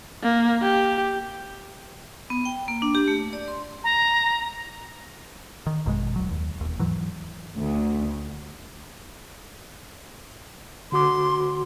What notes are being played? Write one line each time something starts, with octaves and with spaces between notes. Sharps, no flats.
A#3
G4
B3
G5
A#3
D4
G4
A3
D5
C6
A#5
D#3
G#1 F#2 B2 G#3
D1 F#3
D#2
E1 D#2
G#2 E3 F#3
D2
D3 F#4 C6 D6